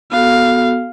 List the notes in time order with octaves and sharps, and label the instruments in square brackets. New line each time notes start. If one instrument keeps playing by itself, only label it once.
[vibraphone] B3 F#4 A4 [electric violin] F5